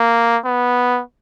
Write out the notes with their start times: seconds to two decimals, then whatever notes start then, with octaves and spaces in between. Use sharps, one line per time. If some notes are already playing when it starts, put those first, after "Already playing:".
Already playing: A#3
0.44 B3